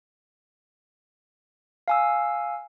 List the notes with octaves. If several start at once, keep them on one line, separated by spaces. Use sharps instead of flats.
F5 G#5 E6